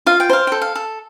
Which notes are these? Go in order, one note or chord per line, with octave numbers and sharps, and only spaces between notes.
F4 F5
G5
C5 F5
A4 G5
F5
A4